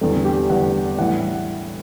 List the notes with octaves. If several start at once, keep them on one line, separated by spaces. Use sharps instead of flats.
E2 D3 G3 A4
G4
E2 D3 G3 F#5
A2 E3 G3 F#5